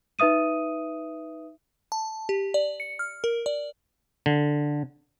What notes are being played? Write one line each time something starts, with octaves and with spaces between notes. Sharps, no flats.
D#4 B4 E5 D#6 D#7
A5
G4
D5
C#7
F6
A#4
D5
D3